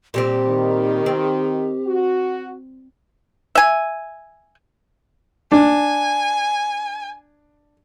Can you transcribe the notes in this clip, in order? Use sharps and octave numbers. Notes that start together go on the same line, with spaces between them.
A#2 G3 C4 G4
D#3
C4
F#4
E5 G#5
D4 G#5